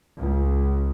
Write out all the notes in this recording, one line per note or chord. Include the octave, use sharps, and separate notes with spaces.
C#2